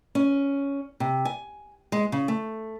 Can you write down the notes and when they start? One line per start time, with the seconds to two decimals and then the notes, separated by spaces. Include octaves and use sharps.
0.15 C#4
1.00 C3
1.25 G#5
1.92 G#3
2.12 C#3
2.28 A3